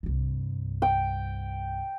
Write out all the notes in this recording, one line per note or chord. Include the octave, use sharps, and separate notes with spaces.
C2 G2
G5